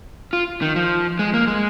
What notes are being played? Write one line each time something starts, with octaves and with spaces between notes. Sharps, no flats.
F4
D#3
F3
G#3
A#3
G#3